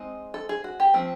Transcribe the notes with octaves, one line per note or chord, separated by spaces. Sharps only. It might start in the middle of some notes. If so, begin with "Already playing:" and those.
Already playing: G#3 C4 D#4
A4
G#4
F#4
G4
F3 A3 C4